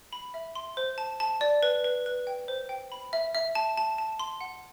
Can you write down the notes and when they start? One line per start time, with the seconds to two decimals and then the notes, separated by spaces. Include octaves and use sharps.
0.13 B5
0.34 E5
0.55 C6
0.77 C5
0.98 A5
1.20 A5
1.41 D5
1.63 B4
1.84 B4
2.06 B4
2.27 G5
2.48 C5
2.69 G5
2.92 B5
3.13 E5
3.35 E5
3.55 A5
3.77 A5
3.98 A5
4.19 C6
4.41 F#5